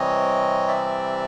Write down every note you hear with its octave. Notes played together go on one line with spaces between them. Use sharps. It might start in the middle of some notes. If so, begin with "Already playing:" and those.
Already playing: C3 E3 G3 C4 C#5 D#5
D5 E5